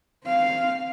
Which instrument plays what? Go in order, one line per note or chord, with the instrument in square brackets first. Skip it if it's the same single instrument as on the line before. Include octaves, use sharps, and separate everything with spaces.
[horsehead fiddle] C4 F5